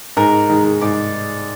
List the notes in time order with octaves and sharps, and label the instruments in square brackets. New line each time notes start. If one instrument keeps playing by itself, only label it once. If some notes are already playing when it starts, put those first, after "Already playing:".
[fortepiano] G#2 [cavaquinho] A#4
[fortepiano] D#3 G#3
[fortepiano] G#2 [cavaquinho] D5